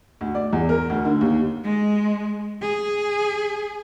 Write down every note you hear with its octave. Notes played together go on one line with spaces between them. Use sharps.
D2
D5
E2
A#4
D2
D3
D#2
G#3
G#4